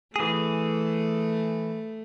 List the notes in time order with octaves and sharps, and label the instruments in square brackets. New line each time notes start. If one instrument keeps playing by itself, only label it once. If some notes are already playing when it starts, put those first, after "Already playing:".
[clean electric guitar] E3 G#4 [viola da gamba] A3